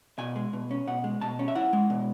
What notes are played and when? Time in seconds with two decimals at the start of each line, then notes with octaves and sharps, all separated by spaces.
0.18 B2 G#5
0.36 G#3
0.53 B2
0.71 C#4
0.87 B2 F#5
1.04 G#3
1.21 B2 A5
1.39 C#4
1.48 E5
1.55 E4 F#5
1.73 G#3
1.90 B2